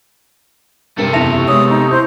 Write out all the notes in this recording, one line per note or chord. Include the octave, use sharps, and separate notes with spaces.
G2 C3 A3 A#4 C#7
F#1 E2 E5 A5 A#6 F7
C#6 E6
G#3 B3 C#5 D#6
D#4
E4 C5 G6